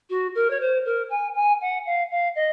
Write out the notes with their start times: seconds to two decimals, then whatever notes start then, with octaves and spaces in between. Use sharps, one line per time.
0.10 F#4
0.35 A#4
0.50 C#5
0.61 C5
0.85 A#4
1.10 G#5
1.35 G#5
1.61 F#5
1.86 F5
2.11 F5
2.36 D#5